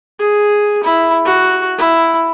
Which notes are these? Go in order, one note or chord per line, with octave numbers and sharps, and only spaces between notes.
G#4
E4
F#4
E4